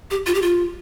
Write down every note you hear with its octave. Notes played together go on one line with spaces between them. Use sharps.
G4
F4
G4
F4